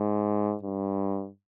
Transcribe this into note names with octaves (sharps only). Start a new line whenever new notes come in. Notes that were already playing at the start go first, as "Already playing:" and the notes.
Already playing: G#2
G2